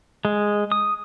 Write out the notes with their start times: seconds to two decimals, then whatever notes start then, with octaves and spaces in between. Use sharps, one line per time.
0.25 G#3
0.72 D#6